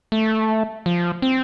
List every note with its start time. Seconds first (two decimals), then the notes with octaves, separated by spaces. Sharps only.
0.12 A3
0.86 F3
1.22 C4